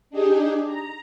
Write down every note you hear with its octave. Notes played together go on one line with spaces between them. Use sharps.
D4 D#4 G4 G#4
A#5